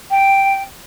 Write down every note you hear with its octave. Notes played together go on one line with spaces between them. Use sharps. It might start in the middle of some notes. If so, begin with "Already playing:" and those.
G5